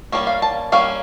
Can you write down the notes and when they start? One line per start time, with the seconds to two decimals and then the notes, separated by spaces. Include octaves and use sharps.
0.12 G3 A#3 C#4
0.27 F5
0.42 A5
0.72 G3 A#3 C#4 F5